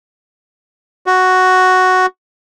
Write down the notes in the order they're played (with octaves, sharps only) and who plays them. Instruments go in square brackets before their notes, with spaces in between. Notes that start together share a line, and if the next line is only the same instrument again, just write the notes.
[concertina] F#4